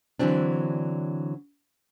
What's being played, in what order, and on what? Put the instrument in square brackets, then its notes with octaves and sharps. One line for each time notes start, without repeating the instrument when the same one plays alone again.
[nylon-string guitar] D3 E3 F#3 C4 D4